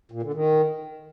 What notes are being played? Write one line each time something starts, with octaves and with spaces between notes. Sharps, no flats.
A#2
D3
D#3